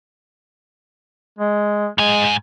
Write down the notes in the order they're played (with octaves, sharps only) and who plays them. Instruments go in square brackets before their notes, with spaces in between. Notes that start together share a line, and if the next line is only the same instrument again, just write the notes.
[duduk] G#3
[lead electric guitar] G#2 G#5 [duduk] G#3